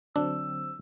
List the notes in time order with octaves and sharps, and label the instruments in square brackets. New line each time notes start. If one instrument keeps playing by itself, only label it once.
[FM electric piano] D3 F#3 C4 [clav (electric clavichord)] D4 [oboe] E6